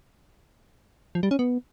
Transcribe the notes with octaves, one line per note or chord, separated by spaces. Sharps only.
F3
G3
C#4
B3